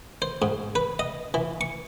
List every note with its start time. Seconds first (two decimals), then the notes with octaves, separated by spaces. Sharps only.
0.22 C5
0.42 G#2
0.75 B4
0.99 D#5
1.34 E3
1.61 C#6